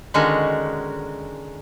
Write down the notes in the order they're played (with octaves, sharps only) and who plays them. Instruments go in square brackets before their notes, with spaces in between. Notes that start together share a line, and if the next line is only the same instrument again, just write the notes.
[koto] D3 D#3 G#3 C#4 D#4 F#4